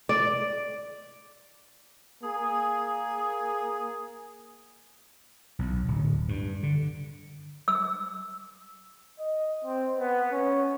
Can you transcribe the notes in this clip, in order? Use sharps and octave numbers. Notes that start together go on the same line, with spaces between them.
D5
A#3 G#4
B1
D1
G2
D3
E6
D#5
C4
B3
C#4